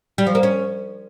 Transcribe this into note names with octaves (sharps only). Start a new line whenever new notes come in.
G3
F3
A#3
C#4